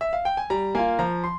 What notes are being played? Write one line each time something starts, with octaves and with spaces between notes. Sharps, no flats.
E5
F5
G5
G#5
G3 A#5
A#3 F4 G#5
F3 A#5
C6